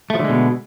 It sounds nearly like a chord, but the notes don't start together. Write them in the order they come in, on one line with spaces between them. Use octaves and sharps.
A3 F3 D3 G#3 B2